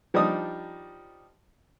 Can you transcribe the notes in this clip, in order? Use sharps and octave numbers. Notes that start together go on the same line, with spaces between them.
F3 G3 D4 D#4 D#6